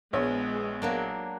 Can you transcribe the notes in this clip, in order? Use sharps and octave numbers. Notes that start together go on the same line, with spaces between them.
A#1 G#3 B3 C#5
F#3 A#3 D4